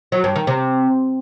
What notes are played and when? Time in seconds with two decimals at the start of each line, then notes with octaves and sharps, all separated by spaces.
0.12 F#3
0.24 G2
0.36 D#3
0.47 C3